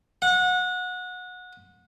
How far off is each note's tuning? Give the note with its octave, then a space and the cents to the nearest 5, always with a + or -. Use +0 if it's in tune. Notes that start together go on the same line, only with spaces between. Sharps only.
F#5 -25